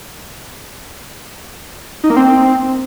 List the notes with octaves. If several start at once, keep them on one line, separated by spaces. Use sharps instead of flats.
D#4
A#3
C4